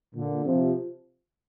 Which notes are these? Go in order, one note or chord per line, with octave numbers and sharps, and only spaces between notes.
A#2 D3
C3 F3